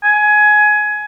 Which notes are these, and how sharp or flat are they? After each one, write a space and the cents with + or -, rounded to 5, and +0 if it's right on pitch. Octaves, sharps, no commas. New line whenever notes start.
G#5 +20